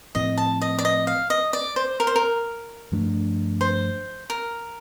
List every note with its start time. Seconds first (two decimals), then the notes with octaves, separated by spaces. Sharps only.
0.15 A2 F3 C4 D#5
0.38 A5
0.62 D#5
0.79 D5
0.85 D#5
1.07 F5
1.30 D#5
1.53 D5
1.76 C5
2.00 A#4
2.07 C5
2.16 A#4
2.92 G2 F3 A3 D4
3.61 C5
4.30 A#4